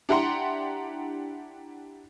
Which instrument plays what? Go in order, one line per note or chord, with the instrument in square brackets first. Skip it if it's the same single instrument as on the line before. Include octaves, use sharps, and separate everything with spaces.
[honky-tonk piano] D4 E4 G4 F#5 A#5 C6